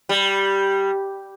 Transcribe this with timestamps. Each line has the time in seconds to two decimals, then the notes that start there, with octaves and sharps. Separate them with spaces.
0.09 G3